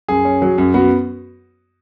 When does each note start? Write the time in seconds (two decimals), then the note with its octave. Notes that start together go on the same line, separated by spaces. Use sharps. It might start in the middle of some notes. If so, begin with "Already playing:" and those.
0.08 F#2 G#4
0.25 C#4
0.42 F#3
0.58 F#2
0.74 B3 F#4